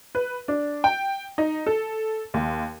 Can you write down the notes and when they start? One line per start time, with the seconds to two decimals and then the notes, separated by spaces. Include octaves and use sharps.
0.15 B4
0.48 D4
0.84 G5
1.38 D#4
1.67 A4
2.34 D#2